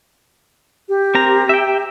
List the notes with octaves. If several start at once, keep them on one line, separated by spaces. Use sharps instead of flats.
G4
C4 A#4 A#5
E5 G5